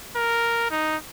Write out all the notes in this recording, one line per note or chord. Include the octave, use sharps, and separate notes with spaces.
A#4
D#4